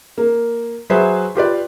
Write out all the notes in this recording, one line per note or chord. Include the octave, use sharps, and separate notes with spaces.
A#3
F#3 G#4 B4 C5 E5
F4 G4 B4 D5